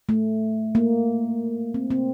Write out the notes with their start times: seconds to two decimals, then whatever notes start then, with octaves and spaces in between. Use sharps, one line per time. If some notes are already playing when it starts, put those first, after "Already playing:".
0.09 A3
0.75 A#3
1.74 C4
1.91 C4